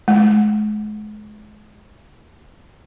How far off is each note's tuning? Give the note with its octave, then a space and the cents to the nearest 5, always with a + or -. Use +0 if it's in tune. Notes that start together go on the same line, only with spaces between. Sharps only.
G#3 +35